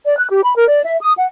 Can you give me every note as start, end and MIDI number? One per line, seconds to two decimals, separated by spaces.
0.05 0.17 74
0.18 0.28 90
0.30 0.41 67
0.43 0.54 83
0.55 0.64 70
0.67 0.80 74
0.84 0.97 76
1.00 1.13 87
1.17 1.27 78